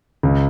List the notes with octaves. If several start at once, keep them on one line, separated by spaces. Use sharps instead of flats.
C#2